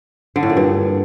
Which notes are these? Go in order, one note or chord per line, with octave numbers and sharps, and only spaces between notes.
D3
A2
A#2
G2